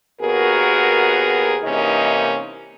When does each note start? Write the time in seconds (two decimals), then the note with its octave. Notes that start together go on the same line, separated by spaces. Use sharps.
0.21 D#2 B3 F#4 G#4 A#4
1.64 C3 E3 A#3 C#4 D#4 D#5